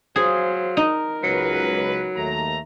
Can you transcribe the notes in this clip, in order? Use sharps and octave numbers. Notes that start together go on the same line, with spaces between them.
F#3 G#4 C5 F5
D#4 A#4
C#2 F#3 B4
D#2 A3 A#5